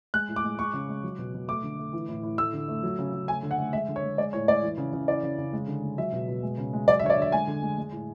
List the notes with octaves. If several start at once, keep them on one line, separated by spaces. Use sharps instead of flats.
G#3 F#6
A2
D6
G#3
G#3 C#6
C#3
G#3
F#3
B2
B2
A3 D6
D3
A3
E3
A2
A2
A3 E6
D3
A3
F#3
C#3
C#3
A3 G#5
D3
F#5
A3
G#3 E5
D3
C#5
G#3
G#3 D5
A2 C#5
G#3 D5
E3
C#3
C#3
E3 D5
C#3
C#3
G#3
D3
G#3
F#3 E5
B2
B2
G#3
C#3
G#3
F#3 D5
E5
D3 C#5
D5
D3 E5
G#3 G#5
D3
G#3
G#3
A2